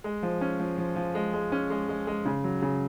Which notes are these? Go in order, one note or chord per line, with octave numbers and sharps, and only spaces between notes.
G#3
F3
C#4
F3
F3
F3
G#3
G#3
C#4
G#3
G#3
G#3
C#3
F#3
C#3